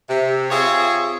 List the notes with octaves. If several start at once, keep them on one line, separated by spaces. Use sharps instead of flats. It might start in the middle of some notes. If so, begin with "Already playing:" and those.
C3
C4 F4 G#4 C#5 E5